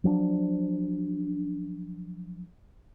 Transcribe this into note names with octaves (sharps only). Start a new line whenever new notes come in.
F3 F#3 A#3 D4